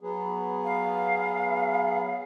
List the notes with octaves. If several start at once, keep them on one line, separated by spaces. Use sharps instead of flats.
F#3 B3 G#4
F5